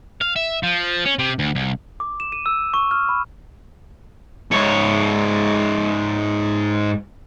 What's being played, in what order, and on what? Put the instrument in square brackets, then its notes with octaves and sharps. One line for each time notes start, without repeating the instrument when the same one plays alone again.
[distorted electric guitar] F5
E5
F3
C#4
C3
D2
C2
[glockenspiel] D6
E7
D#7
E6
C#6
F6
B5
[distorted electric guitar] G#2 C#5